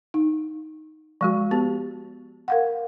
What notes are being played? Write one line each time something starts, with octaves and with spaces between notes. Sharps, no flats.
D#4
F3 G#3 F#4
B3 G4
A#4 F5 F#5